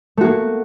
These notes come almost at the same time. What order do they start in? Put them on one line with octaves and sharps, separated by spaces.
A3 F#4 A#3